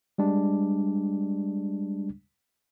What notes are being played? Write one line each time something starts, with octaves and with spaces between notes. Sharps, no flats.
G3 G#3 D4